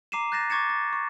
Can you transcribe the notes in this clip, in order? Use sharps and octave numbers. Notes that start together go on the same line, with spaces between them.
A#5 D6 C7 D#7 E7
F#6 G6 A6 A#6 C7 E7
C#6 D6 G#6 A6 C#7 E7
A6
C#6